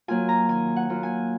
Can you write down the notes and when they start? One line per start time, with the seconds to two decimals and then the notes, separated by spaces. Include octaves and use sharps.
0.08 F#3 A#3 F4 G#5
0.29 A#5
0.49 D#3 G#5
0.76 F#5
0.90 F#3 A#3 F4
1.03 G#5